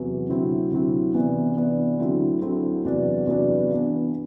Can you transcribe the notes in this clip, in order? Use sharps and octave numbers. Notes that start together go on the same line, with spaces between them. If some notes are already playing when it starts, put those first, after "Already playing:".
Already playing: E2 C3 F#3
D2 C3 F#3 C4 E4
D2 C3 F#3 C4 E4
C3 E3 B3 D4
C3 E3 B3 D4
D2 D3 F#3 C4 E4
D2 D3 F#3 C4 E4
E2 C3 F#3 B3 D4
E2 C3 F#3 B3 D4
G2 E3 B3